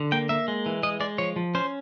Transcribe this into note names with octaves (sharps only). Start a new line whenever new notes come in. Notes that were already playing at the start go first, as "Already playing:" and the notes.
Already playing: D3
A#3 G5
A#3 E5
G#3
E3
G#3 D#5
G#3 D5
F3 C#5
F3
C#4 C5